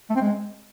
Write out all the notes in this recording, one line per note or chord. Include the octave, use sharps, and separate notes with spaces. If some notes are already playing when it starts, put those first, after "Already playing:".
A3
C4
G#3